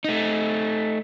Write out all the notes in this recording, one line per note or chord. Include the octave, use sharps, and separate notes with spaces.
A3 D#4